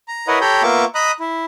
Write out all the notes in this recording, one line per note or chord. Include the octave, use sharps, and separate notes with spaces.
A#5
E4 A#4 B4 C#5 D#5 F#5
G4 A4 C#5 G5 A#5 B5
A#3 B3 F4 E5 C#6 D6
D#5 A#5 B5 D#6 F#6
E4